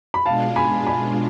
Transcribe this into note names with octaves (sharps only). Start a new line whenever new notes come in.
B5
B2 G#3 D4 F4 F5 A5
G#5 B5
G#5 B5